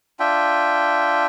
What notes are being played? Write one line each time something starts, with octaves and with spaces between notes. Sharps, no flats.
D4 F4 E5 G5